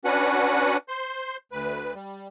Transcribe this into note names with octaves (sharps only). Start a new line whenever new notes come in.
C#4 D4 F#4 B4 F#5
C5 C6
D2 B4
G3